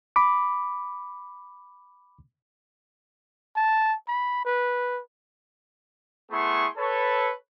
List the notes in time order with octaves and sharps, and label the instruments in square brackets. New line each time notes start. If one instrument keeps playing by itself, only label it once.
[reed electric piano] B5 D6
[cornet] A5
B5
B4
[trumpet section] A3 B3 E4 G#4 C6 C#6
A4 B4 C#5